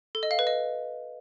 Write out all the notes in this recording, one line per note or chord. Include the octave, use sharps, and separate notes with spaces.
A4
D#5
F5
B4
D#5